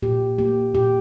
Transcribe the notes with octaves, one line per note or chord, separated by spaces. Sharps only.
A#2 G4
A#3 G4
A#2 G4